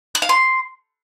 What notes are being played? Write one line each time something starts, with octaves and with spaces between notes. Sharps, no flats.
F#6
F5
C6